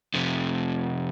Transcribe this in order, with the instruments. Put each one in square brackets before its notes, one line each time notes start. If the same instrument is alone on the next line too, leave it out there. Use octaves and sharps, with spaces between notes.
[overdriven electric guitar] F2 C3